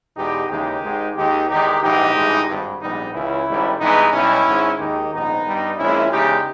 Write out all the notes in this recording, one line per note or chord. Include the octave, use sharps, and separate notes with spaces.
E2 B2 G#3 D#4 G4
D#2 C#3 E3 G#3 D#4 G4
G#1 G#2 D#3 G#3
D#2 D#3 G#3 D#4 G4
E2 D#3 G#3 D#4 G4
A#1 G#2 E3 D#4 G4
G#1 G2 E3 G#3
G#1 G2 G3
A#1 G#2 G3 B3 D#4
C#2 C#3 E3 C#4 E4
G#1 G#2 D#3 G3
G2 E3 G#3 B3 D#4
B1 B2 G3 C#4 E4
G#1 G#2 D#3 G#3
D#2 D#3 G#3 D#4 G4
A#1 G#2 D#3 B3 D#4
G2 G3
A#1 A#2 G#3 C#4 E4
E2 C#3 G#3 D#4 G4